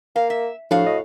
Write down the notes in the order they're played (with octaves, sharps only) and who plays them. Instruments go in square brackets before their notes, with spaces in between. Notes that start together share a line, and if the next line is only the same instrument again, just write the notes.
[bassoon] A#3 [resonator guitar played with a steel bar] F5
[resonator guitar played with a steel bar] E5
[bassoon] A2 [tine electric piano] F3 D4 [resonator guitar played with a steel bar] F#4 F5
[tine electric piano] D#5